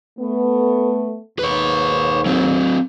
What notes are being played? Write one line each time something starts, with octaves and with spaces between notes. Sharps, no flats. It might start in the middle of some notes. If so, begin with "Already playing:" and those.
A3 B3
D#2 G#2 B4 C#5
F#3 C4